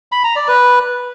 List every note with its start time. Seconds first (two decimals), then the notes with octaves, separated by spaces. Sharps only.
0.12 B5
0.24 A#5
0.36 D5
0.48 B4